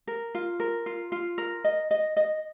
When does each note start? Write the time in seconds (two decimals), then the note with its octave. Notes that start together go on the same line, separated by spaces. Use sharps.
0.07 A#4
0.35 F4
0.60 A#4
0.86 F4
1.12 F4
1.38 A#4
1.64 D#5
1.91 D#5
2.16 D#5